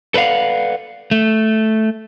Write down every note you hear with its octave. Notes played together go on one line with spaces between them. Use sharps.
A4 B4 D5 F5 F#5
A3